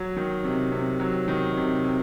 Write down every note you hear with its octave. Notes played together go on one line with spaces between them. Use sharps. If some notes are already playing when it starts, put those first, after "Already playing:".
Already playing: F#3
D#3
C3
C3
F#3
D#3
C3
C3